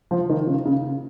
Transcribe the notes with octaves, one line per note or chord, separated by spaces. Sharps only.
F3
D#3
C#3
C#3